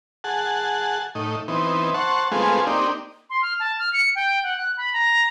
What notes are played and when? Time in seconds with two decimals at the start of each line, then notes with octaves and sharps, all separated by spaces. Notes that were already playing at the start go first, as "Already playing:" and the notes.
0.24 G#4 F#5 A5
1.15 A2 D#4
1.48 E3 B3 C4 D#4
1.94 C5 F#5 A5 C#6
2.31 G#3 A3 B3 C4 F4 G#4
2.67 A#3 C4 D4 D#4 G4
3.30 C6
3.42 F6
3.60 A5
3.79 F6
3.93 C#7
4.15 G5
4.43 F#5
4.57 F#6
4.77 B5
4.93 A#5